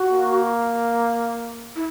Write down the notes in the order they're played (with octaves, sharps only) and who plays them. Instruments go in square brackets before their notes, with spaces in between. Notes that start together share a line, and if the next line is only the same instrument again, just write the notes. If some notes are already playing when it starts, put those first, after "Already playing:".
Already playing: [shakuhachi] F#4
[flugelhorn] A#3
[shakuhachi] E4